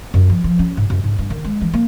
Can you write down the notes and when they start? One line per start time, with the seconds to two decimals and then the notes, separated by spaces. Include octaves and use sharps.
0.14 F#2
0.30 F3
0.44 F3
0.59 C#4
0.77 G#2
0.90 F#2
1.04 G#2
1.18 G2
1.30 D#3
1.44 G#3
1.61 E3
1.73 A#3